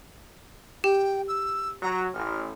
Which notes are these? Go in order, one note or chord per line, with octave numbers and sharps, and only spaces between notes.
G4 G5
E6
F#3 A#5
A1 F6